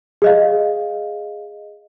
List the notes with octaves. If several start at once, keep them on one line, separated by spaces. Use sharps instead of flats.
G#4 D#5 F5